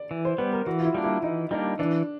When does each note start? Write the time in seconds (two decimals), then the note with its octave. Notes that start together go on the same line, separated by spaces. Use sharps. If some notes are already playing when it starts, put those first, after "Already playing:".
Already playing: D5
0.11 E3
0.25 C5
0.38 G3 B3 B4
0.53 A#4
0.66 E3 F#4
0.80 F4
0.85 E4
0.94 G3 A#3 D4
1.04 E4
1.23 E3 D#4
1.51 G3 A#3 D4 D#4
1.79 E3 D4